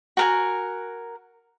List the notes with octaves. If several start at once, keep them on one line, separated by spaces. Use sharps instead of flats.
F#4 A#4 G#5